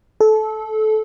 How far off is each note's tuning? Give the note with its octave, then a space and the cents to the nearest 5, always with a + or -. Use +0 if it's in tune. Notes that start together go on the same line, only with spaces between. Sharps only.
A4 -20